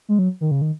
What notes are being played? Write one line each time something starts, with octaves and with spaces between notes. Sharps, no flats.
G#3
F#3
D#3
C#3
D#3